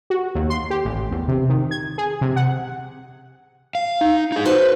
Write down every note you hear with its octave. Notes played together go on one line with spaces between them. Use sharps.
F#4
D#2
C6
G4
A1
E2
C3
D#3
G#6
G#4
C3
F#5
F5
D#4
D#4 G#4
F#4 A4 B4 C5